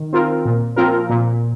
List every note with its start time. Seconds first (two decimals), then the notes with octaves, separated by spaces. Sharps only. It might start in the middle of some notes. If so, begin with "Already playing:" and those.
Already playing: D#3
0.13 C4 F4 A#4
0.45 A#2
0.76 F3 C4 F4 A#4
1.10 A#2